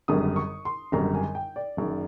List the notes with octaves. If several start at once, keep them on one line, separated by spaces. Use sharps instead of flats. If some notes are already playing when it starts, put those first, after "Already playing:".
G#1 F#2 D3 G3 D#6
C#6
C6
G#1 F#2 D3 G3 A#5
G#5
G5
D5
F#1 F#2 D#3